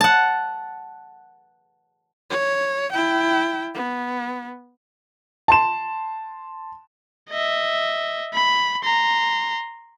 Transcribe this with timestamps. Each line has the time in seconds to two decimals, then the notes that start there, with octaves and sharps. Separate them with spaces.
0.01 F#5 A5
2.30 C#5
2.92 E4 G5
3.75 B3
5.48 A5 C6 E7
7.30 D#5 E5
8.34 B5
8.84 A#5 C6